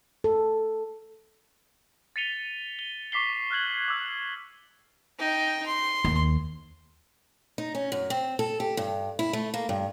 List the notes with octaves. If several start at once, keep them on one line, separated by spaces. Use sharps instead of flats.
A4
A6 B6 C#7 D#7 F7 G7
G7
C#6 D6 B6 C7 G7
F6 F#6 G#6 F#7
D6 E6 F#6
D#4 G5
C6
D#2
D#4
C#4
F#2
C4
A4
G4
G2
E4
A3
A#3
G2